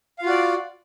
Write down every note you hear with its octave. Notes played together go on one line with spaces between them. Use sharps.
F4 F#4 D5 F5